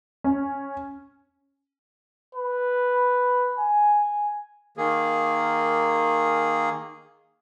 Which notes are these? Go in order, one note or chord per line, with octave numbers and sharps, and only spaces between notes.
C#4
B4
G#5
D#3 A#3 G#4